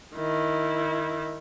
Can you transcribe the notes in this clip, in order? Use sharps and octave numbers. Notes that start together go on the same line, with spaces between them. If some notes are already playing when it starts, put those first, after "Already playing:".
D#3 E4